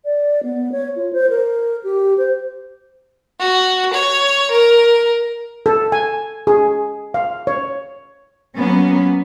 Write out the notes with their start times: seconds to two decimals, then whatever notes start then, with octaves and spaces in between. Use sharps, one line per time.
0.05 D5
0.43 B3
0.72 C#5
0.96 F4
1.13 C5
1.30 A#4
1.84 G4
2.18 C5
3.39 F#4
3.93 C#5
4.50 A#4
5.66 A4
5.92 G#5
6.47 G#4
7.14 F5
7.47 C#5
8.55 F#3 A#3 B3 C#4